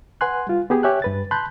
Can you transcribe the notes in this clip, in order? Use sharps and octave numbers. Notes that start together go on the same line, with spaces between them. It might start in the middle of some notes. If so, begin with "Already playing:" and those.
B4 F#5 G#5 C6 F#6
G3 F4
B3 G4 G#4
G4 C#5 E5 G#5 F#6
G2 B4 A6
A5 B5 C6 F#6 G6